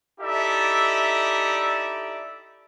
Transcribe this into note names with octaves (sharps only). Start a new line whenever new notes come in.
D#4 E4 G4 A4 D5 E5